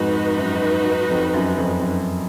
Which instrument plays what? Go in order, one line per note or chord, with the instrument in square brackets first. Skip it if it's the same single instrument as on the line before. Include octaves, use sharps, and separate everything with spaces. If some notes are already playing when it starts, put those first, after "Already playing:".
Already playing: [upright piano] F2 G#2 [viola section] D#4 F#4 B4
[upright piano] F#2
F2
F#2
F2
F#2